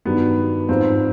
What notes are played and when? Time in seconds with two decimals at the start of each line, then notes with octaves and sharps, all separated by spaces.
0.05 G2 D#3 F#3 B3
0.69 G#2 F3 C4